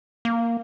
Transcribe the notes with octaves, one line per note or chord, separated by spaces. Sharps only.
A#3